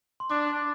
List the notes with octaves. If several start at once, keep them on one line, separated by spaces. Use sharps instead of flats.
C6
D4 D6